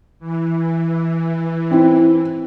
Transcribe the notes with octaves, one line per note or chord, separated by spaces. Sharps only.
E3
C4 E4